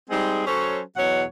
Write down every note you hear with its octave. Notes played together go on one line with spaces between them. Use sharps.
G3 G#3 C4 D#4 G#4
F#3 C#4 A4 C5 C#5
E2 B2 F#3 C#5 F#5